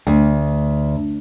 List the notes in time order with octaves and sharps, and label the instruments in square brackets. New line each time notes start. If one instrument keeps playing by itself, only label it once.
[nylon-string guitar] D2